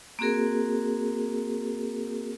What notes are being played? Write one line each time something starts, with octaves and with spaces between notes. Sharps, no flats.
A#3 C4 F#4 G#4 A#4